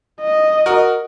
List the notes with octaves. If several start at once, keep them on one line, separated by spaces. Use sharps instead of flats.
D#5
F#4 A#4